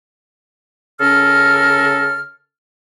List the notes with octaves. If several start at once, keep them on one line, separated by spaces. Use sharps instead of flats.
C#3 C#4 A4 A#4 F6